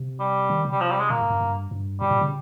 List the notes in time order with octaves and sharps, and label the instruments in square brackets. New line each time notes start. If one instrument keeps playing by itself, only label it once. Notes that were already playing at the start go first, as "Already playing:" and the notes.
Already playing: [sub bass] C3
[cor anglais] G3
[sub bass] D#3
C3
[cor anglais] G3
F3
G3
G#3
[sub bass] A#2 [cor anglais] A#3
[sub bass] G#2
G2
G2
G2
[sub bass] G#2 [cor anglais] G3
[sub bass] A#2
C#3